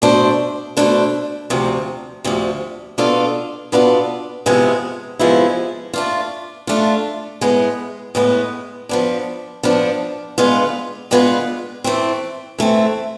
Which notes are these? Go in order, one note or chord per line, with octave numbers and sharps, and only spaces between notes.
B2 A3 D4 A4 C5
B2 A3 D4 A4 C5
D2 C3 F3
D2 C3 F3
B2 B3 D4 F4 A4
B2 B3 D4 F4 A4
C3 F3 G#3 B3 E4
C3 F3 G#3 B3 E4
A3 D4 F4
A3 D4 F4
A2 G#3 B3
A2 G#3 B3
F3 B3 D4
F3 B3 D4
D3 G#3 B3 F4 B4
D3 G#3 B3 F4 B4
E3 A3 C4
E3 A3 C4